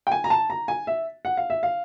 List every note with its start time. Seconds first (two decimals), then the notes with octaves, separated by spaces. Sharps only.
0.07 G5
0.12 G#5
0.24 A#5
0.30 A5
0.50 A#5
0.68 G#5
0.87 E5
1.25 F#5
1.37 F5
1.50 E5
1.63 F5